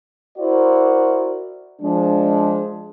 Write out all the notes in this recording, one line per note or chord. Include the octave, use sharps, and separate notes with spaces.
E4 F#4 A#4 C5 D5
F3 G#3 D4